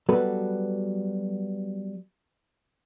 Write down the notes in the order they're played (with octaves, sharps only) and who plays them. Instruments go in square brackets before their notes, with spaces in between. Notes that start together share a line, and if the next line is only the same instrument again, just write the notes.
[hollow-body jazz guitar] F#3 G3 B3 F#4 A4 B4